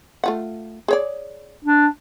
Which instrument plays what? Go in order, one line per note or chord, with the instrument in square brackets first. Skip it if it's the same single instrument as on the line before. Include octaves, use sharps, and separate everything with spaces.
[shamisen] A3 F4 F#5
G#4 C#5 D5
[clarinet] D4